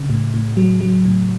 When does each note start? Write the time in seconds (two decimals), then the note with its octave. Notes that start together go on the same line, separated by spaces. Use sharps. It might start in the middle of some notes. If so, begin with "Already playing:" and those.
Already playing: C#3
0.10 A2
0.34 A2
0.57 F#3
0.81 F#3
1.05 A2